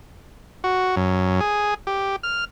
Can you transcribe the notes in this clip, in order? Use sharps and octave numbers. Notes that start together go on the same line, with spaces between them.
F#4
F#2
G#4
G4
F6